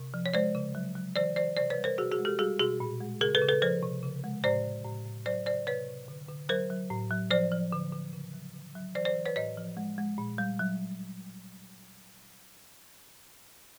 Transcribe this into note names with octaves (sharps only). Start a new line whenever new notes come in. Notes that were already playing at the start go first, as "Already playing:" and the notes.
Already playing: C3
F3
C#5
G#3 C5 D5
C#3
F#3
F#3
E3 C5 D5
E3 C5 D5
C3 C5 D5
B4 C#5
G3
A#4 C5
B2 F#4 G#4
F#4 G#4
G#3
G4 A4
G3 F#4 G#4
B2 F#4 G#4
A#2
G#3
C#3 G#4 A#4
A4 B4
C#3
A4 B4
F3 A#4 C5
C3
C#3
G#3
A2 C5 D5
A2
A2
A2
F#3 C5 D5
C#3 C5 D5
C3 B4 C#5
C3
D3
D3
F#3 A#4 C5
F#3
A2
F#3
F3 C5 D5
F3
D3
D3
C#3
F#3
D3
F#3
E3 C5 D5
C5 D5
E3
B4 C#5
A2 C#5 D#5
F3
G#3
G#3
A#2
G3
F#3